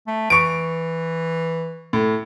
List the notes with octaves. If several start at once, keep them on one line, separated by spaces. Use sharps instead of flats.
A3
E3 C#6 D7
A2